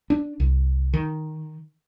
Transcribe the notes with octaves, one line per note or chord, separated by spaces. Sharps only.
D4
C2
D#3